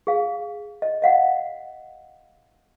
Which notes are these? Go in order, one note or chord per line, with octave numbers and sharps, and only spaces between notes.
G#4 F5
D#5
D#5 F5 F#5